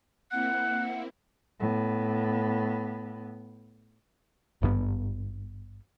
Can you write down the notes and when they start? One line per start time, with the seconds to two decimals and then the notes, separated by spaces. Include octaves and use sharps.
0.31 A#3 C4 E4 F#5 F#6
1.60 A2 B3
4.62 G#1 G2 C3 B3